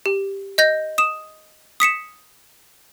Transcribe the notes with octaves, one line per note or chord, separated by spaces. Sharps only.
G4
D#5 G6 A#6
D#6 E7
D#6 B6 C#7 E7